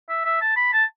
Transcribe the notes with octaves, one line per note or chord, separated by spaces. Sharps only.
E5
E5
A5
B5
A5